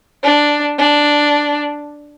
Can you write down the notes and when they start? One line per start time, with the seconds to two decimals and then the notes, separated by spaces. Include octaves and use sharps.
0.24 D4
0.78 D4